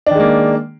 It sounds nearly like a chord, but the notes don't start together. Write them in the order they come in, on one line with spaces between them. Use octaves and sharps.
D4 D#3 G#3 A#3